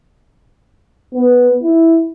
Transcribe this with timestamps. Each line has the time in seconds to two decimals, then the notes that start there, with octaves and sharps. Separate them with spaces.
1.14 B3
1.62 E4